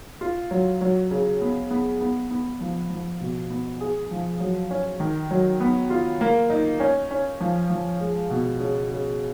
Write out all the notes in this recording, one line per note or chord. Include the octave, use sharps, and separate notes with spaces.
F4
F#3
F#3
C#3
B3
B3
B3
B3
F3
F3
B2
B3
G#4
F3
F#3
C#4
D#3
F#3
B3
F4
A#3
D#4
C#4
C#4
F3
F3
G#3
B2
C#3
C#3